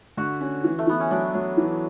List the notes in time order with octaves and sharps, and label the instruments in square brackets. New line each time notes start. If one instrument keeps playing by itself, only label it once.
[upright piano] D3 [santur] F#4
[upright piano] C#4
E3
[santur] A3
[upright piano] E3 [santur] B3
[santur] C#4
[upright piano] F#3 [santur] D4
[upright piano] F#3
E3